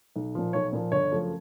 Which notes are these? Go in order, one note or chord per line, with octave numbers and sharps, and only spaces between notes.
B1
A#2 F3
B1 C#5
A#2 F3
G1 C#5
F#2 C#3 F3 A3